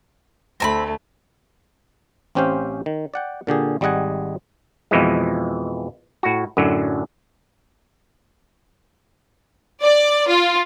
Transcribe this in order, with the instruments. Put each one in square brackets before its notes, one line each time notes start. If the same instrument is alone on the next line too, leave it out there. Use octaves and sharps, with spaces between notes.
[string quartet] D2 A3 [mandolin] C4 A5 B5
[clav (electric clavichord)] A1 C4 C#4 G4 C5 F5
D#3
D5 F#5 G5
A#2 D3 G4 G#4
G#1 G3 G#3 D#5 F#5 G#5
F2 B2 E3 F3 G#3
A2 F#4
F#2 A2 D3 F#3
[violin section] D5
F4